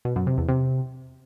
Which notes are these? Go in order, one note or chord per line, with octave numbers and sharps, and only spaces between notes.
B2
F#2
C3
E2
C3